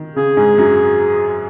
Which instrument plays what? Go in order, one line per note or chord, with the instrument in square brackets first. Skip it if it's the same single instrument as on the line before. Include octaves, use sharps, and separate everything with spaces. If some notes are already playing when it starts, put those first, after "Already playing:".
Already playing: [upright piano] D#3
[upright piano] C#3 [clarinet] G#4
[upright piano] G#2 G#3
F#2 F#3